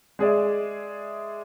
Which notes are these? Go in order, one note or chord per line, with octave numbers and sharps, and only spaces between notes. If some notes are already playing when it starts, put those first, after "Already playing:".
G#3 G#4 D5 E5